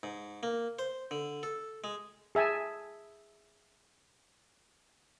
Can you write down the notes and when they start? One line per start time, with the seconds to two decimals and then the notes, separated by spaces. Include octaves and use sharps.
0.03 G#2
0.43 A#3
0.79 C5
1.11 D3
1.43 A4
1.84 G#3
2.35 G#4 E5 G#5 A5